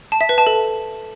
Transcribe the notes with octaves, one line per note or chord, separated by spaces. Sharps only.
A5
E5
B4
A5
A4